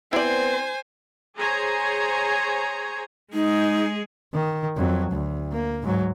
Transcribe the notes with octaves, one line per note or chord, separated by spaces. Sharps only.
B3 C4 E4 C5 D5 G#5
G#4 C5 C#5 G#5 A#5
G#3 D#4 G#4
D#3
F2 F#3
D2
A#3
G#2 F#3